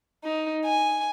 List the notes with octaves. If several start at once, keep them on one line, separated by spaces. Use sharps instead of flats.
D#4
G#5